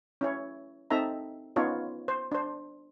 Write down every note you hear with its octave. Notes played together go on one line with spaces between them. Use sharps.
C#4 E4 C#5
C4 D#4 A4 E5 A#5
B3 C#4 D#4 F4 C#5
C5
D4 C5